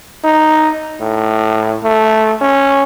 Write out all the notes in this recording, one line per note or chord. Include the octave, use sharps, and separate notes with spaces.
D#4
A2
A3
C#4